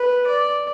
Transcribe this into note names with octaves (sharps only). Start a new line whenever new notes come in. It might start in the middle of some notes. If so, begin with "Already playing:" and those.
Already playing: B4
D5